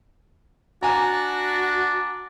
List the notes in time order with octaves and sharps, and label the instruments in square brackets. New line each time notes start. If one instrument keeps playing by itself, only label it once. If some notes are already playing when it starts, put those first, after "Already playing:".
[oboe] D4 [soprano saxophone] F#4 [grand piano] G#5 A#5